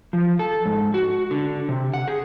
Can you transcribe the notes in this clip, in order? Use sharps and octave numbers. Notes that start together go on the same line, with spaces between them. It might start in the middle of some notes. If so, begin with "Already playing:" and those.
F3
A4
G#2
F#4
D3
C3
F#5
G#4